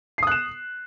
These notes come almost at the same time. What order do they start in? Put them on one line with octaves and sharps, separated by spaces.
C7 D#6 F#6 E7